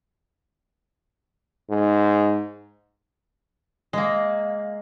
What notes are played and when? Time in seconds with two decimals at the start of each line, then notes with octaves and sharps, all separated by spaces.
1.70 G#2
3.93 G#3 A#3